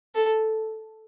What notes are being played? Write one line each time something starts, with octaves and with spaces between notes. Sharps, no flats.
A4